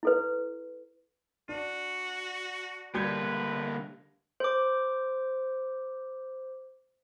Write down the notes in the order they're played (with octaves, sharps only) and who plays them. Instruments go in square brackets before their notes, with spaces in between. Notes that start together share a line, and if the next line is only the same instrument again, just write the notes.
[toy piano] E4 A4 B4
[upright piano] D4 [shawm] F#4
[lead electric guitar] D3 A#3 [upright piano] G3 G6 G#6 [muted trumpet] B4
[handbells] C5 D6